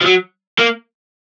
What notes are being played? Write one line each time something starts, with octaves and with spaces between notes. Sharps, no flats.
F3
F#3
A#3